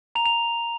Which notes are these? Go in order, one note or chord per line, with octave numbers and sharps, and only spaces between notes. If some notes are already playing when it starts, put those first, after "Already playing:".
A#5 F7
F7